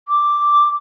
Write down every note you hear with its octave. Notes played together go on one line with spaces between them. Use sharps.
D6